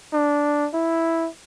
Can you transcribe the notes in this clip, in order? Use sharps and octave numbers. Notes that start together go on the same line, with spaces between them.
D4
E4